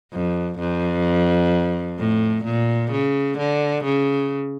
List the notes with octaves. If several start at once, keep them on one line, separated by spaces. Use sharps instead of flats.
F2
F2
A2
A#2
C#3
D3
C#3